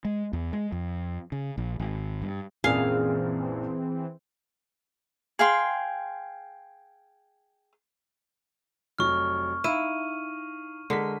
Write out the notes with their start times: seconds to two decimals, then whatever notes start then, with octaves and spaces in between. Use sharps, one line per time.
0.05 G#3
0.33 E2
0.53 G#3
0.72 F2
1.32 C#3
1.58 A#1
1.80 G#1
2.22 G2
2.64 A#1 F#2 A#2 E3 C4 G#4 F5
5.39 G#4 F5 G5 C6
8.99 F1 F#3 C#6 F6
9.64 D#4 E4 F5 D#7
10.90 D3 G#3 A#4 B6